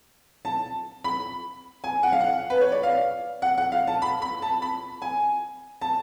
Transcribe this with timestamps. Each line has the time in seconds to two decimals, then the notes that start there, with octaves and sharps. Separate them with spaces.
0.45 A5
1.04 B5
1.84 G#5
2.03 F#5
2.12 F5
2.21 F#5
2.50 B4
2.61 C#5
2.72 D5
2.83 F5
3.42 F#5
3.58 F#5
3.72 F5
3.87 A5
4.02 B5
4.22 B5
4.42 A5
4.62 B5
5.02 G#5
5.81 A5